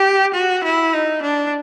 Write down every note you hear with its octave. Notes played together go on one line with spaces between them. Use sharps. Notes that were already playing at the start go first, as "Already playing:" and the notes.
Already playing: G4
F#4
E4
D#4
D4